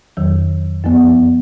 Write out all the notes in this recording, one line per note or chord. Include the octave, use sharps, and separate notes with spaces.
F2 D#3 F#3
F#2 F3 B3